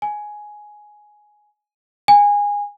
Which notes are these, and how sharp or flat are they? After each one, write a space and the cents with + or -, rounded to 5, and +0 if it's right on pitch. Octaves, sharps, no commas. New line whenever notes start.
G#5 +10
G#5 -20